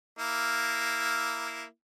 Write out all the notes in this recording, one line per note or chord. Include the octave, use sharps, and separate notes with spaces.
A#3 E4